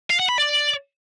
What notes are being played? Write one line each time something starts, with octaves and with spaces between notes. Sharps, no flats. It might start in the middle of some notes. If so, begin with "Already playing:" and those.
F5
F#5
B5
D5